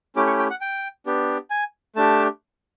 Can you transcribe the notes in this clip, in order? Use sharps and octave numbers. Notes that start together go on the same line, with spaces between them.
A3 C#4 E4 G4 D6
C#6
G5
F#5
G5
B3 D4 G4
G#5
A3 D4 G4 A5